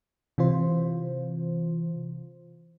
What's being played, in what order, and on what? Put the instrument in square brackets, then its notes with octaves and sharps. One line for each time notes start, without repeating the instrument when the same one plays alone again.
[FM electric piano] C3 E3 F4 C5